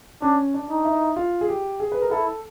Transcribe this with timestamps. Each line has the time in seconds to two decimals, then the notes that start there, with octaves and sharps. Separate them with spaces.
0.22 C#4 D4
0.54 D4
0.70 D#4
0.85 E4
1.16 F4
1.41 G#4
1.48 G4
1.80 G#4
1.92 B4
2.02 A#4
2.11 E4 A4